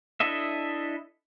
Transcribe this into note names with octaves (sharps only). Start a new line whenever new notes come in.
D4 E4 A4 D#5 E5